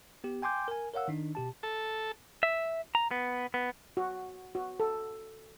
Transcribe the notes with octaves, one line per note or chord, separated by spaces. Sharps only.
B3 G4
G5 G#5 C6 D6 G6
A#4 G#5
A#4 C#5 F5 F#5 E6
D#3 D4 D#4
B2 G4 A5
A4
E5
A#5
B3
B3
F#4
F#4
A4